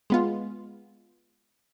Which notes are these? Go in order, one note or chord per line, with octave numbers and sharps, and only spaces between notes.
G#3 B3 F4